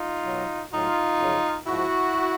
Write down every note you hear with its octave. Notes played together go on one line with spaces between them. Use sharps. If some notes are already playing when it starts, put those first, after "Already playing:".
Already playing: D#4 F4
B2 F#3
A2 F#3 D#4 F4
F#2 C#3 F3
G#2 F3 E4 F#4